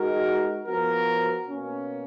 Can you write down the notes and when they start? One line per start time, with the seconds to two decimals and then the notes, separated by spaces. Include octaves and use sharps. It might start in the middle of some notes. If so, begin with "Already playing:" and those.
Already playing: G#3 D#4 F#4 A#4
0.64 F3 B3 F#4 A#4
1.46 B2 A#3 C#4